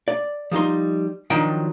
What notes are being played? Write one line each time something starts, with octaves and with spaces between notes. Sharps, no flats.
D5
F3 G3 D#4 C6
D#3 F3 F#3 D4 D#4 G5